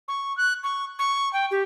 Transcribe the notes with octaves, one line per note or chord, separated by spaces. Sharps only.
C#6
F#6
C#6
C#6
G5
G4